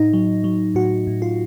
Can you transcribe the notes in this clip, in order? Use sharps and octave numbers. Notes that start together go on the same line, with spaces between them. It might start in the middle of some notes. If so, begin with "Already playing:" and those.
Already playing: A2 D#4
F#3
F#3
A2 F#4
A2
F4